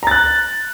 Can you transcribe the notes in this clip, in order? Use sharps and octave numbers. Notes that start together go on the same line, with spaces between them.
A#5 F#6 A6